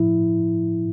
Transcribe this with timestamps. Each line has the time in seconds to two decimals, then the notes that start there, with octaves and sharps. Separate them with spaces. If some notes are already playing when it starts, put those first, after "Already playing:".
Already playing: A2 F3 E4